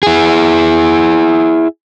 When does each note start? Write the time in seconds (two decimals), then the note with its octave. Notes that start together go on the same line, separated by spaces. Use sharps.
0.03 E4 G#4